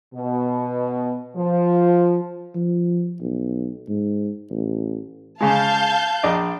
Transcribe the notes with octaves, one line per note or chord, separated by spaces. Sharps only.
B2
F3
F3
B1
G#2
A1
C#3 G#3 F5 A5 G6
A#1 D5 D#5